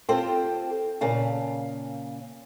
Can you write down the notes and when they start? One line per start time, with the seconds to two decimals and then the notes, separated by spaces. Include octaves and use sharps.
0.09 C4 F4 G4 A4 C5
1.01 A#2 C#3 F5 A5